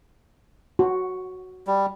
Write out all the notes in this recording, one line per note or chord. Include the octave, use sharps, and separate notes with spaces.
F#4
G3